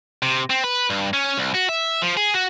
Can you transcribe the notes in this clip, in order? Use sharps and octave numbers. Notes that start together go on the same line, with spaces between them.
C3
C4
B4
G2
C#4
C2
F#4
E5
F3
G#4
F#4